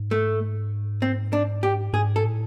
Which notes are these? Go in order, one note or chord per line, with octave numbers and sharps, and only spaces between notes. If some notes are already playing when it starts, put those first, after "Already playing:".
Already playing: G#2
A3
C4
D4
G4
G#2 G#4
A4
A2